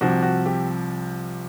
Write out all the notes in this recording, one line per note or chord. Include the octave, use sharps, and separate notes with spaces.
C2 C3 F3 F#4
F#4
G4